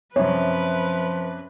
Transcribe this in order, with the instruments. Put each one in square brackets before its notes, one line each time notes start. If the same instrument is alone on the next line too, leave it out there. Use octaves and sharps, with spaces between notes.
[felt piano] F#2 C3 [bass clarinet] F3 [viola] B4 [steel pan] C#5